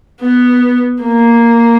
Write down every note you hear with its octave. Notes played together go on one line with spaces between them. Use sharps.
B3
A#3